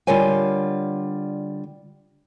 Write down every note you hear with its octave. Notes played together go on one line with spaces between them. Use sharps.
D3 G3 F4 A#4 C#5 G#5